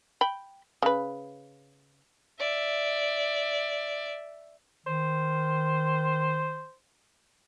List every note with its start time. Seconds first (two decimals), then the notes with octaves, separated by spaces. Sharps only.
0.21 G5 B5
0.82 C#3 B4
2.39 D5 E5
4.86 D#3 C5